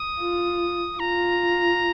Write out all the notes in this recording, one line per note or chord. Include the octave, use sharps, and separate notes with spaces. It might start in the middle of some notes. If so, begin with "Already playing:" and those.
Already playing: D#6
F4
F4 A#5